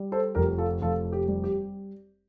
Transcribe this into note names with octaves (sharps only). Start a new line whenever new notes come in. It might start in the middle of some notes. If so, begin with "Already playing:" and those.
Already playing: G3
A4 C5
F1 G4 A#4
F4 A4
F1 F4 A4
A4
G4
G3
G4